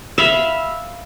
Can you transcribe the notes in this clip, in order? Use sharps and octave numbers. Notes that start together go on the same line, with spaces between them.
E5 F5 B5